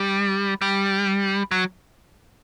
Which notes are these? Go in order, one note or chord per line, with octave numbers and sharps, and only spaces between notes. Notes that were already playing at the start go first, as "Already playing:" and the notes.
Already playing: G3
G3
F#3